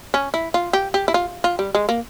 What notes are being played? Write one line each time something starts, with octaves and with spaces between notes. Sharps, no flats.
C#4
E4
F4
G4
G4
E4
F4
F4
G3
G#3
A#3